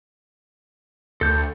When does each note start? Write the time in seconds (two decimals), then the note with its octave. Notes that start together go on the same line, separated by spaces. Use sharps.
1.21 D2 A4 G6